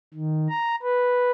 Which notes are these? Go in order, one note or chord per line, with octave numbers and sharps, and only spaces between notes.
D#3
A#5
B4